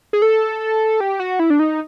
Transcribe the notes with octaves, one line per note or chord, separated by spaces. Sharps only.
G#4
A4
G4
F#4
E4
D4
D#4